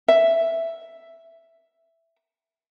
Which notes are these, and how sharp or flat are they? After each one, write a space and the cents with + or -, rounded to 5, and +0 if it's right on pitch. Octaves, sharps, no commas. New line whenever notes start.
E5 +5